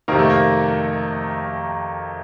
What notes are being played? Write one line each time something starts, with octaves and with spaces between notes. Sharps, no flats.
F2 C3 D#3 A#3
A3
A#3